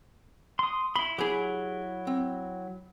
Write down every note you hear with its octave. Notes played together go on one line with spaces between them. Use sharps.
C6 D#6
E4 B5 C6
F#3 E4 G4 G#4
C4